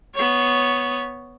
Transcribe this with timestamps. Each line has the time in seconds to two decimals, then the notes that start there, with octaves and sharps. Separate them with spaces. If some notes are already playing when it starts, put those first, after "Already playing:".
0.15 B3 C#5